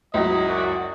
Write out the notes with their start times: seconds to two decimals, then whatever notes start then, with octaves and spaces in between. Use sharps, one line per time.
0.14 C#2 F#3 E4 D#5
0.46 F#2 F#4 D5